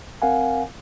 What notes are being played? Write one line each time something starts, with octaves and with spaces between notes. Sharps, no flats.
C4 A#4 F5 F#5 G#5